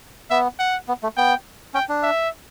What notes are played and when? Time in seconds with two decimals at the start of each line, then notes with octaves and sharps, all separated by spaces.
0.30 B3 E5
0.59 F#5
0.88 B3
1.03 A3
1.17 B3 G5
1.74 C#4 G5
1.89 D4
2.03 E5